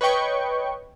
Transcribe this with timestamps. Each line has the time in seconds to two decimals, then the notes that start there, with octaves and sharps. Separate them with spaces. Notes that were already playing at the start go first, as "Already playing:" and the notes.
0.01 B4 C#5 D#5 G5 C#6